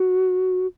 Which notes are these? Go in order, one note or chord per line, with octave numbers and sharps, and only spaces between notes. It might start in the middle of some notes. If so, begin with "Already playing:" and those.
Already playing: F#4